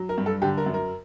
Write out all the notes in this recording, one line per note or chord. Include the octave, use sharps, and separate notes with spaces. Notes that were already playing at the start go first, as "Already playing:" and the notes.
Already playing: F#3
A#4
G2
A4
D3 G4
A#4
F#2
A#4